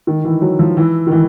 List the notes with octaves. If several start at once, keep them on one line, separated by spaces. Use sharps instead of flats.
D#3
E3
F#3
F3
E3
D#3
E3